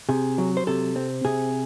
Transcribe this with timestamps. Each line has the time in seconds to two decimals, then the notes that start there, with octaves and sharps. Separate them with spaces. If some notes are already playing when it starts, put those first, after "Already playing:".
0.09 C3 G#4
0.38 F#3
0.57 C5
0.67 C3 A4
0.96 C4
1.25 C3 G#4